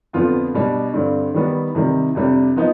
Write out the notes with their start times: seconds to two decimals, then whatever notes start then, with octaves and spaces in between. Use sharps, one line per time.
0.13 F2 D3 F3 B3 F4
0.54 B2 G3 D4
0.94 G2 D3 G3 C4
1.34 D#3 G3 B3
1.75 C3 D#3 G3
2.15 F2 C3 G3 D4
2.56 F3 B3 D#4